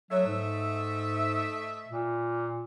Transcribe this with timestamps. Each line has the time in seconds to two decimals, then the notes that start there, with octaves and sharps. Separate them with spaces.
0.11 F#3 A3 D#5 E5
0.26 G#2
1.89 A#2